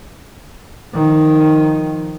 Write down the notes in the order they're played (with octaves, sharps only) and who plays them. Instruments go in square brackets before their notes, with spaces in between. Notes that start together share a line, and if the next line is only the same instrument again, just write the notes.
[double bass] D#3 F3